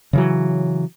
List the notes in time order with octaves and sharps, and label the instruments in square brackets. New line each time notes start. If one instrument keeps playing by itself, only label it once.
[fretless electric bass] C#3 E3 F#3